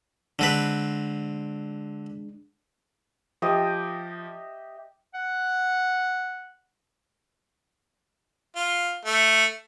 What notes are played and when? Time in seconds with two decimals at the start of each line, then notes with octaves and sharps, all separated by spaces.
0.39 D3 G#3 C4 D4 B4
3.42 F3 G4 D#5 E5
5.15 F#5
8.56 F4
9.05 A3